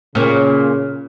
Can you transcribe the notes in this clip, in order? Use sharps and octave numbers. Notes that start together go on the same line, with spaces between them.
A#2 C#3 C#4